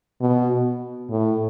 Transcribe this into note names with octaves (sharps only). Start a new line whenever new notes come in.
B2
A2